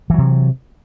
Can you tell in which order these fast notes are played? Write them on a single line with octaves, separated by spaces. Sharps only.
E3 F#3 C3